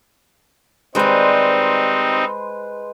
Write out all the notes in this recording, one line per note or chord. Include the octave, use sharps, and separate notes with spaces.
D#3 G3 G#3 C4 D#4 B4 C5